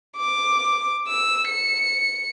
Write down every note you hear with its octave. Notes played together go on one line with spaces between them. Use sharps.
D6
E6
C#7